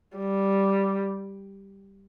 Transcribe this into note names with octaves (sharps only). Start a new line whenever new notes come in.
G3